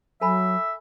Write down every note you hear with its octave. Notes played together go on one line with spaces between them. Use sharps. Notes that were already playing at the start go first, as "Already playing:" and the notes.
F#3 A4 E5 G#5 B5